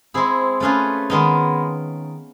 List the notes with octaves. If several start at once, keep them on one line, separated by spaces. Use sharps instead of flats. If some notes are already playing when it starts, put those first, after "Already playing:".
G#3 C4 E4 G#4
A3 C#4 F4 G#4 B4
D#3 G#3 B3 D#4